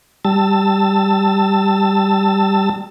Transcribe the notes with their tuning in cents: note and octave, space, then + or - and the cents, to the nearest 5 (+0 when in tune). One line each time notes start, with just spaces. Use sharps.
G3 +0 A5 +15 E6 +0